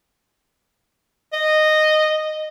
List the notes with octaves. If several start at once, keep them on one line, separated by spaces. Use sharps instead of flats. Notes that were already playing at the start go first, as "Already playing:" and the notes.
D#5